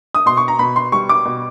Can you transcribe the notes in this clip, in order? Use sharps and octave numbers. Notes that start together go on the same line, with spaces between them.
D#6
B2 C6
C#6
A#5
B2 B5
C6
G3 C#6
D6
B2